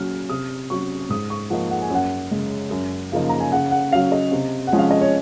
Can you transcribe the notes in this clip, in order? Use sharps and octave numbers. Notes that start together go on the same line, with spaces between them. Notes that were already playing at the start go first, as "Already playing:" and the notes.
Already playing: A#2 F#3 C#4 F6
C3 D#6
F#3 C#4 C#6
G#2 D#6
C#6
F3 A#3 D#4 F#5
F#5
G#5
F#2 F#5
C#3 G#3 C#4
F#2
C#3 F3 A#3 D#4
A#5
G#5
C#3 F#5
F#5
F#3 C#4 F5
D#5
C3
F#5
F3 G#3 C#4
F5
D#5
C#5